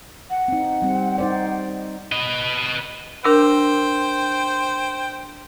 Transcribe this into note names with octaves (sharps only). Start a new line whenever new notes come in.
F#5
C4 D#4
G3 C4
D#4 C5 D5
B4 D#5
D4 A#4 C5 G5 E6